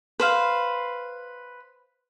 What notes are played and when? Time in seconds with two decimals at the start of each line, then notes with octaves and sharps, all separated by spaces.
0.20 B4 C5 F5